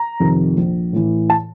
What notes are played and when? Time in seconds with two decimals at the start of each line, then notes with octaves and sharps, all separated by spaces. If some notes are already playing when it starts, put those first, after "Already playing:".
Already playing: A#5
0.20 F2 C3 D#3
0.57 A#1
0.93 A2 E3
1.30 A5